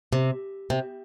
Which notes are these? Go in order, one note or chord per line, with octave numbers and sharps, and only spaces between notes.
C3
C3